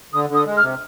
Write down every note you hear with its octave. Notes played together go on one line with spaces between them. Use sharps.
D3 D#6
D3 D#6
G#3
F6
C3